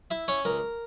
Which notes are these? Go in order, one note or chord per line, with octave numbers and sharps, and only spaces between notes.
E4 E5
C#4 C#5
C#2 A#4